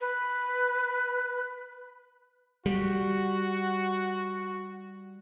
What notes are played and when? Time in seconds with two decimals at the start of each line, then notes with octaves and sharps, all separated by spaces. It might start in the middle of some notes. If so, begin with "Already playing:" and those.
0.01 B4
2.66 G3 F#4